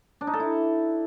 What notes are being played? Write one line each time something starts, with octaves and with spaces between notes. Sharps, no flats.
D4
D#4
A4
E4